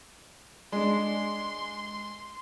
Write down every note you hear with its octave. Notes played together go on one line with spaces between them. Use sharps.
G#3 D4 C6